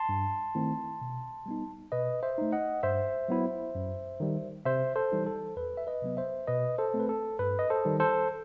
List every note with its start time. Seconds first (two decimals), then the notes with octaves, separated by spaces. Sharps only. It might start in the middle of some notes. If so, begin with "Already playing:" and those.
Already playing: A5 C6
0.09 G2
0.55 D#3 A3 C4 E4
1.01 B2
1.46 G3 B3 D#4
1.92 B2 B4 D#5
2.23 C5 E5
2.38 A3 D#4
2.52 D#5 F#5
2.83 G2 C5 E5
3.28 F#3 B3 E4
3.75 F#2
4.20 D#3 G3
4.65 C3 C5 E5
4.96 A4 C5
5.12 E3 G3 D#4
5.26 A4
5.56 E2 B4
5.77 E5
5.87 B4 D#5
6.02 C3 F#3 B3
6.17 C5 E5
6.47 B2 B4 D#5
6.78 A4 C5
6.94 A3 C4
7.00 B4
7.09 A4
7.39 G2 B4
7.59 D#5
7.70 A4 C5
7.85 D#3 G3
8.00 A4 C5